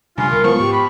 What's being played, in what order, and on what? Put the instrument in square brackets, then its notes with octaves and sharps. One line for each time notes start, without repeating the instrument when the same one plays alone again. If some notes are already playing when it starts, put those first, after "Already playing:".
[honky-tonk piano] G2 [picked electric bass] C3 [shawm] F4 [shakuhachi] G#5
[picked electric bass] C2 C3 G3 [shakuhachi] A#4
[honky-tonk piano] F3 B3 F4 [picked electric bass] G#3 [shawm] C#6
[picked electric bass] G#2 [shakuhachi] G4
[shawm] B5